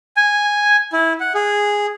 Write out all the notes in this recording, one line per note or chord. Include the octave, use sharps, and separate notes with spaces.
G#5
E4
F#5
G#4